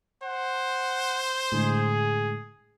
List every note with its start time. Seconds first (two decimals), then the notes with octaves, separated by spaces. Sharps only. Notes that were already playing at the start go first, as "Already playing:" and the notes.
0.23 C5 F#5
1.52 A2 D3 G#3 G#4